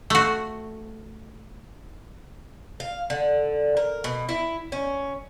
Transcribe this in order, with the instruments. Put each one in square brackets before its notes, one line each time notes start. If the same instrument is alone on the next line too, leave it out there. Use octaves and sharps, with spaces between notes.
[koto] A3 F#4
[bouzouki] F5
D3
A#4
B2
E4
C#4